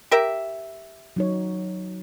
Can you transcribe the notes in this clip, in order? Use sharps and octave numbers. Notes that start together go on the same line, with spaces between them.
G4 A#4 E5
F#3 D#4 C#5